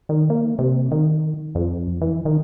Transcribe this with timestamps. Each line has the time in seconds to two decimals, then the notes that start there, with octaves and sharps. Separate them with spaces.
0.09 D#3
0.30 A#3
0.59 C3
0.92 D#3
1.55 F2
2.01 E3
2.25 D#3